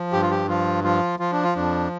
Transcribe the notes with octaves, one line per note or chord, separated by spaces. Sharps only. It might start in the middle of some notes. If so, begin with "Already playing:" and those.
Already playing: F3
G2 G4
F4
G4
F3 F4
F3 F4
F3 F4
D4
F4
F2 D4